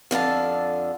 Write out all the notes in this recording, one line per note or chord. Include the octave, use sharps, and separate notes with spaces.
F2 D3 F5 A5